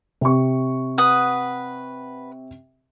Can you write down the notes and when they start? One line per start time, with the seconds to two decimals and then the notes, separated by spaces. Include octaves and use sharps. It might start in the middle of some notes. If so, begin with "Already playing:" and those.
0.21 C3 G4 C#6
0.98 B4 F#5 D#6